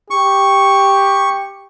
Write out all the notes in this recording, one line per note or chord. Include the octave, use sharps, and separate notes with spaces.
G4 C#6